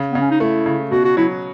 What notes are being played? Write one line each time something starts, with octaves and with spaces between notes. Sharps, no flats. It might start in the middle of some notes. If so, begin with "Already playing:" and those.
Already playing: C#3
C#3 B3
C#4
D#4
A3 E4
C#3
B2 F#4
F#4
F#3 E4